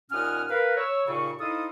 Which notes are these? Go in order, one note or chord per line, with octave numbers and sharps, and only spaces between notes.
D#2 A#2 C#4 F#5 D#6 F6
A#4 B4 F5
C#5 E6
D#2 A#2 C#3 C#6
D#4 E4 A4 C5 F5 D#6